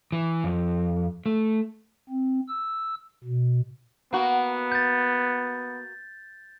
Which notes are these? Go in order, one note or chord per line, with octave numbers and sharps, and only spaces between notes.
E3
F2
A3
C4
E6
B2
A#3 B3 F#4
G6 A6